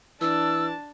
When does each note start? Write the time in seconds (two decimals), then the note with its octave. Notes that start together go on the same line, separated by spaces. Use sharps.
0.21 E3 D4 A5 E6